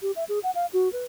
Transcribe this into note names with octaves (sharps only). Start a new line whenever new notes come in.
G4
E5
G#4
F#5
F5
F#4
B4